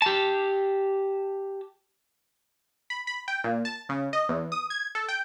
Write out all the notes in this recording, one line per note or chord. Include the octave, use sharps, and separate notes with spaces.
G4 A5
B5
B5
G5
A#2
A5
C#3
D#5
E2
D#6
G#6
A4
G5